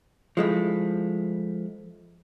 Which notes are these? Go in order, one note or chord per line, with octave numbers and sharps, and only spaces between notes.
F3 G#3 A3 E4